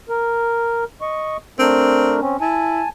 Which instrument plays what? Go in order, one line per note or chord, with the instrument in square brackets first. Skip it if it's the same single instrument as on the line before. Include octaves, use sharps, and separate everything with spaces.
[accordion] A#4
D#5 C#6
[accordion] A3 D4 A#4 [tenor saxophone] C4
[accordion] C4 C#4
[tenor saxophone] E4 [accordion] G#5 A5